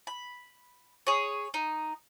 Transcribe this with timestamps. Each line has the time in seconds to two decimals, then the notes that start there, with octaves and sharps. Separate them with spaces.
0.07 B5
1.07 G#4 C#5
1.54 D#4